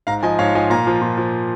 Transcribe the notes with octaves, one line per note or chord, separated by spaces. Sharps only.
G#2 F5 A#5
F3 D#5 G#5
G#2 C#5 F5
F3 D#5 G#5
A#2 F5 A#5
F3
A#2
F3